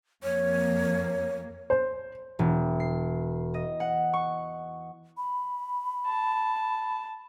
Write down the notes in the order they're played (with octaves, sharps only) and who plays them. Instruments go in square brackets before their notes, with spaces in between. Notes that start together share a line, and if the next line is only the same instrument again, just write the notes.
[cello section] F2 A#3 [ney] C#5
[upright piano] C5
[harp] E1
C7
D#5
F#5
C#6
[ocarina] B5
[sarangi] A5